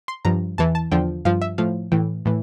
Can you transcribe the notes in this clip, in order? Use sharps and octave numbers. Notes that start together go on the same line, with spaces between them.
C6
G2 F3 A#5
E2 E3 A5
A5
E2 D3 F3 G5
G2 F3 F5
E5
A2 F3 F5
A2 E3 G5
A2 E3